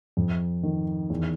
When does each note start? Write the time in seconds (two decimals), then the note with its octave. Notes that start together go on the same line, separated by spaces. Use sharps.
0.17 F2
0.63 D#3
1.10 E2